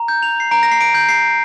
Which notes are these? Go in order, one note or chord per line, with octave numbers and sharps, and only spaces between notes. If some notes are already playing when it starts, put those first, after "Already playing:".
Already playing: A#5
G6
F7
C7
A#5 D7
A#6
C7
D7
G6
C7